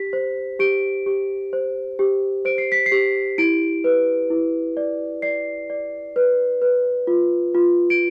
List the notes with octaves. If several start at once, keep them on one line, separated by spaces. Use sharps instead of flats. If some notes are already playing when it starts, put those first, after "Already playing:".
Already playing: G4 B6
C5
G4 D7
G4
C5
G4
C5 D7
C7
B6
C7
G4
E4 D7
B4
E4
D5
D5 C7
D5
B4
B4
F4
F4
D7